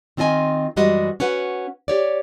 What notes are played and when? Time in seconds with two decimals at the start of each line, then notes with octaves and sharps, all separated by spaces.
0.17 D#3 C4 F4 D#5 G#5
0.76 F#2 E3 G3 G#3 F#4 D#5
1.20 C#4 F#4 B4 F#5
1.88 G4 C#5 D5